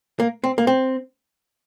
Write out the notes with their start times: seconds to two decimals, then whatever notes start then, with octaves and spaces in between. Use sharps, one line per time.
0.20 A#3
0.44 C4
0.58 A#3
0.67 C4